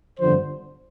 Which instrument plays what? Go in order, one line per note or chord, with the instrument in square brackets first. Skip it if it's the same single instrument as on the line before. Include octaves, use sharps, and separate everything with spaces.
[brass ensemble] G1 F2 D3 F3 C5